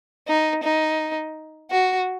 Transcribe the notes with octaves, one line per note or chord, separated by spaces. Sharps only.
D#4
D#4
F#4